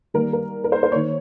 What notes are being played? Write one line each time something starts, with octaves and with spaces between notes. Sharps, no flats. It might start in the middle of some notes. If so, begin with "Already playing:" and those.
D#3 G3 A#3 A#4
A#4
A#4
C5
C5
D#3 A#3 C#5